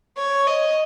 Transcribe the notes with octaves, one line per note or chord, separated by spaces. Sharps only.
C#5
D#5